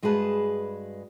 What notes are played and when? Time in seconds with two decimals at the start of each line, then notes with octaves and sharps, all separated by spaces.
0.02 G2 G#3 F#4 G#4 B4 A5